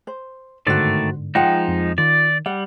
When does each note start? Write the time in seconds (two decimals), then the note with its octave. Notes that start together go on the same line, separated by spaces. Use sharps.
0.07 C5
0.67 G1 G#2 D3 D#3 A3 F#4 C5 D5
1.35 F3 G#3 D#4 F4 F#5 G5
1.68 F2
1.98 D#3 F4 D5
2.46 G3 F#5